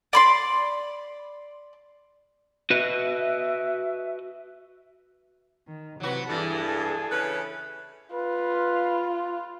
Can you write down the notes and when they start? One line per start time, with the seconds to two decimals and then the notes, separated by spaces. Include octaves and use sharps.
0.13 D5 B5 C6
2.70 F#4 B4 D#5 E5
5.67 D#3
6.00 C3 F#3 F#4 B4
6.29 G2 E3 G#4 A4
7.11 C#3 C#4 B4
8.14 F4 B4